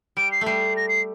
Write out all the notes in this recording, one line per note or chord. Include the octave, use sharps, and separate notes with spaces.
G3 D7
C7
A3
G3 C7
A#6
C7